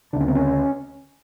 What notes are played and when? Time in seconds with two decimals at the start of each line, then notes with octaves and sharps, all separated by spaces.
0.13 D2 C#3 D4
0.20 C#4
0.28 C4
0.35 C#4